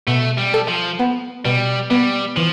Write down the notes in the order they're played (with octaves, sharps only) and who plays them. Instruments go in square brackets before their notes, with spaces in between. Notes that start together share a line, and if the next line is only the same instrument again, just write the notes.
[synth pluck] B2 [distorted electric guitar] A3
[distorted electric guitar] G3
[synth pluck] A4
[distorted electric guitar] F3
[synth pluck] B3
[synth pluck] B2 [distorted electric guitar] G3
[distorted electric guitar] G3 [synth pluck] B3
[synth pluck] E3 [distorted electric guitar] F3